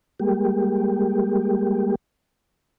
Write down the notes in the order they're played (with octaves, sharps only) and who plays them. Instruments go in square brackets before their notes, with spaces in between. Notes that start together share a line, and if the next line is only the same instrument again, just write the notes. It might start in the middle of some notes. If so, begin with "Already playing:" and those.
[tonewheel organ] G3 G#3 A#3 G4